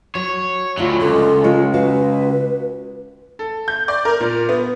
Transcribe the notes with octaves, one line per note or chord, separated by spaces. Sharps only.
F#3 C#5
D2 A2 D3 F#3 F4
C#2 A4
G#3 F4 C#5
F#4 B4 F5
A4
G6
D5
A#4
A#2
B3